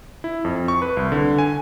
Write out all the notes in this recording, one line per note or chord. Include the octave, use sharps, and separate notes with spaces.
E4
F2
C#6
B4
C2
D3
G#5